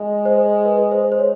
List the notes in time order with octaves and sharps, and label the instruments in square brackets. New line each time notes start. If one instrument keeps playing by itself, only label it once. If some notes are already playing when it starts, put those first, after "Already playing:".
Already playing: [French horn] G#3
[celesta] C5
B4
C5
C5
C#5